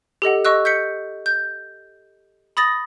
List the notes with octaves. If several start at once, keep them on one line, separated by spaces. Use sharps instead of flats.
G4 A4 D#5 F#5
D#5 C#6 E6 F#6
G6 B6 C#7
G6
B5 D#6 A6 A#6